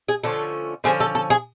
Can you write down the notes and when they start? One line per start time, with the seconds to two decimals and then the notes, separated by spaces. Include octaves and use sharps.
0.08 G#4
0.24 D3 F3 A3 C#4 A4
0.84 D3 F3 A3 C#4 G#4
1.00 A4
1.15 A4
1.30 G#4